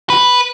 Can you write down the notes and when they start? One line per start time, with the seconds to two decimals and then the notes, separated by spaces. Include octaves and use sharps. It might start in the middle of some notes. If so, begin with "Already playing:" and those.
0.10 B4